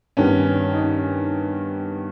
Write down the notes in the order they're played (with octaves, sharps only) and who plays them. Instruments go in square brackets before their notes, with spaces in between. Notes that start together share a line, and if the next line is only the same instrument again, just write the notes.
[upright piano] G2 D#3 G3 B3 [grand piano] C#4
[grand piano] D#4
C#4